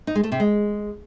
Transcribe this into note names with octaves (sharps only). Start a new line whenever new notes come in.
D#4
G#3
A3
C3
G#3